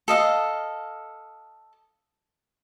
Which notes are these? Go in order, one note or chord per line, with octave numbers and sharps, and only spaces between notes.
A4 D#5 F5